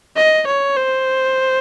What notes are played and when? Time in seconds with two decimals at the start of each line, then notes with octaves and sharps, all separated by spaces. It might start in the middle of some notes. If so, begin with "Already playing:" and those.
0.16 D#5
0.47 C#5
0.76 C5